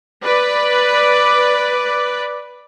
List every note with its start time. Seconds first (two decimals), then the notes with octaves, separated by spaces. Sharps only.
0.23 B4 D5